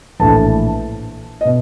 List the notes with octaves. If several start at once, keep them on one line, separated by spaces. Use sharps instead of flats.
A#1 A2 E3 A5
D#5
B2